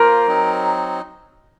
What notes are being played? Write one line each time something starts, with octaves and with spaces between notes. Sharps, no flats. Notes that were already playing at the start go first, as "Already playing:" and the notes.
Already playing: A#3 F4 A#4 C5
F#3 C4 D#4